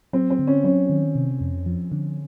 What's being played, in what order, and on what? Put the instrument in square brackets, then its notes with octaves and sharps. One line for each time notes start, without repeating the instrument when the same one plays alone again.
[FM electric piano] F#3 [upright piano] C4
[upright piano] C4
[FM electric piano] D3
[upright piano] C#4
[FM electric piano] F#3 [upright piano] C#4
[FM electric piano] D#3
C3
F2
F3
D3